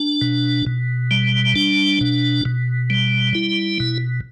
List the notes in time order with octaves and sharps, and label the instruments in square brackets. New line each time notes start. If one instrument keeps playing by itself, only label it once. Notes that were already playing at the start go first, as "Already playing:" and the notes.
Already playing: [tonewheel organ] D4
B2
B2
G3
D4
B2
B2
G3
E4
B2